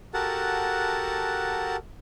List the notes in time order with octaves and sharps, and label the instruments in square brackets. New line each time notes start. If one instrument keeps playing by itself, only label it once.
[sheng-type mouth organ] F#4 G4 A4 A#4 F#5 A5